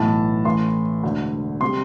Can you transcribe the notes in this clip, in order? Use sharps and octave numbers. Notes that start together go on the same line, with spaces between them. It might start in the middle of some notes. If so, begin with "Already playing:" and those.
Already playing: B1 A2 E3 A5
A1 A2 E3 A3 C6
E1 D2 D3
C3 G3 C6